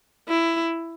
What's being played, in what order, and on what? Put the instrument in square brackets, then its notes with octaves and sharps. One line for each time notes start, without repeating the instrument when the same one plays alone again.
[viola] E4